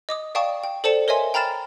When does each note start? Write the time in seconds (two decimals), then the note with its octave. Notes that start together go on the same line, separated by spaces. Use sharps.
0.09 D#5 D6 D#6
0.35 D5 F5 G5 A5 C#6 D#6
0.64 G5
0.84 A4 C5 D5 A5 C#7 E7
1.08 A#4 C#5 D#5 E5 G#5 C6
1.34 G5 A#5 B5 F6 A6 E7